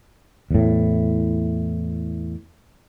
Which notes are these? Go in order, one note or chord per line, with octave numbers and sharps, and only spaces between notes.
E2 A2